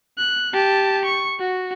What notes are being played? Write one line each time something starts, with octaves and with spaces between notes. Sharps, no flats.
F#6
G4 A5
C#6
F#4